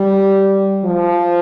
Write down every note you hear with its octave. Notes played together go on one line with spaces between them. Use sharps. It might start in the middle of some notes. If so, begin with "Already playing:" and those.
Already playing: G3
F3